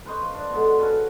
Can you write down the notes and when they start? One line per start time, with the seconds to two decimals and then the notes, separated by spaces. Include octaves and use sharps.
0.06 B4 C5 D#5 C#6
0.22 F3
0.34 D4
0.50 B2 D3 G#3
0.79 C#4 F#4 A4 B4